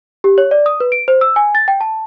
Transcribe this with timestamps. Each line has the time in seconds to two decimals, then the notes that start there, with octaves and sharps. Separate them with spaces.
0.24 G4
0.38 C#5
0.51 D5
0.66 D#6
0.80 B4
0.92 D7
1.08 C5
1.21 E6
1.36 G#5
1.55 A6
1.68 G5
1.81 A5